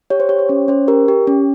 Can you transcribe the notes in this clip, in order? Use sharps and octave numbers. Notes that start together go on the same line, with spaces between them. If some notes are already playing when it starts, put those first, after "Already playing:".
G4 C#5
C5
G4 C#5
C5
C#4 C#5
C#4 C5
G4 A#4
G4
C#4